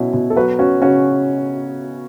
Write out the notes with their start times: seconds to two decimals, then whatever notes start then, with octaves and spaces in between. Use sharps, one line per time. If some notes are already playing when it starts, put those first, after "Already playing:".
Already playing: B2 F#3 C#4 E4
0.13 B2
0.30 A4
0.36 F#3 F#4 B4
0.59 C#4 F#4
0.81 C#3 C#4 F#4